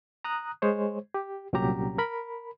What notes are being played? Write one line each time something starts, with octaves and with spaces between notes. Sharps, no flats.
A#5 D#6 F#6
G#3 C5 C#5
G4
C2 A#2 F#3 C#4 G4 A#5
A#4 B5